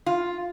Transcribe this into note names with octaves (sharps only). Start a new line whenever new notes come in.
F4